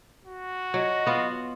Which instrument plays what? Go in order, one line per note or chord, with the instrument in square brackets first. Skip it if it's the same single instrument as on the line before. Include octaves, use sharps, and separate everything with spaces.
[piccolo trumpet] F#4
[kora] F#3 [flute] D#5
[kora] B3 F4